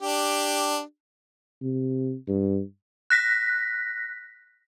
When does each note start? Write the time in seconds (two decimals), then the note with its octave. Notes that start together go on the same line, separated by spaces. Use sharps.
0.01 D4 G4
1.62 C3
2.28 G2
3.10 F#6 A#6 B6